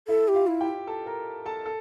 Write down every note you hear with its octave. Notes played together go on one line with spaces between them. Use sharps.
E4 A4 E5
G4
F4 F5
E4
G4 G5
A4 A5
A#4 A#5
A4 A5
A4